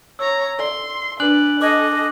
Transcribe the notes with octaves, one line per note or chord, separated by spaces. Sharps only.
C#5 A#5 E6
A4 D5 C6
D4 B4 D5 G#5 F#6 F#7
A4 D#5 D6 F#6 G#6